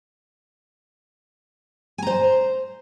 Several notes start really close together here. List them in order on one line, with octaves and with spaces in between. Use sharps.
G#5 A#5 C5